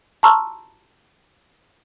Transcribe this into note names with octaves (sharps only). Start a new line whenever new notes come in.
A5 A#5 C6 C#6 E6 F6